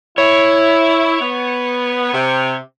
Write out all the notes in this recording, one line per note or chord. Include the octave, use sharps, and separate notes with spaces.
E4 C#5
B3
C3